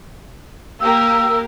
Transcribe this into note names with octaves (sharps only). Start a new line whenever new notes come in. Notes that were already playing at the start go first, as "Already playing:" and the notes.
A#3 G4 A#4 E6